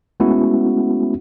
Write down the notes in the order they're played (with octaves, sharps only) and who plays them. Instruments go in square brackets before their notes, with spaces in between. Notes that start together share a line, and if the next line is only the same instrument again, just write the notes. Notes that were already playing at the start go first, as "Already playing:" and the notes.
[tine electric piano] G#3 A3 B3 C#4 E4 F#4